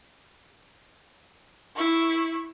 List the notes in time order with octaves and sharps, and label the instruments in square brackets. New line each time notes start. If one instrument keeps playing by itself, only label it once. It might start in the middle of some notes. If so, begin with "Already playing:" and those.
[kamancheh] E4 C#6